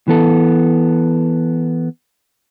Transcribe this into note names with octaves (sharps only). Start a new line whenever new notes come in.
E3 B3 A4